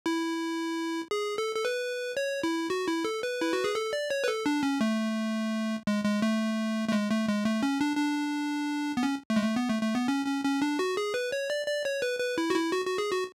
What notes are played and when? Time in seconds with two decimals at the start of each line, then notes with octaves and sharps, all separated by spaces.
0.06 E4
1.11 G#4
1.38 A4
1.56 A4
1.65 B4
2.17 C#5
2.43 E4
2.70 F#4
2.88 E4
3.05 A4
3.23 B4
3.41 E4
3.53 F#4
3.64 G#4
3.75 A4
3.93 D5
4.10 C#5
4.24 B4
4.28 A4
4.46 D4
4.63 C#4
4.81 A3
5.87 G#3
6.04 G#3
6.22 A3
6.88 A3
6.92 G#3
7.10 A3
7.28 G#3
7.45 A3
7.63 C#4
7.81 D4
7.97 D4
8.97 B3
9.03 C#4
9.30 A3
9.36 G#3
9.43 A3
9.56 B3
9.70 A3
9.82 A3
9.95 B3
10.08 C#4
10.26 C#4
10.44 C#4
10.62 D4
10.79 F#4
10.97 G#4
11.14 B4
11.32 C#5
11.50 D5
11.66 D5
11.85 C#5
12.02 B4
12.20 B4
12.38 E4
12.50 F#4
12.55 E4
12.73 F#4
12.86 F#4
12.98 G#4
13.12 F#4